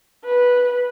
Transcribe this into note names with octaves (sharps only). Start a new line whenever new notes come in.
B4